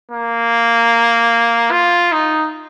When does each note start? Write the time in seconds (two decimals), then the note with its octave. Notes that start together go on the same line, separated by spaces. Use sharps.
0.12 A#3
1.71 F4
2.12 D#4